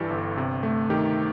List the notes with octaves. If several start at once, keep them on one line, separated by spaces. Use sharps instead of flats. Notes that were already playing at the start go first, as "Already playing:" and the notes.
Already playing: G2 E3 G3 G4 A4
G1
C3
A3
D#3 G4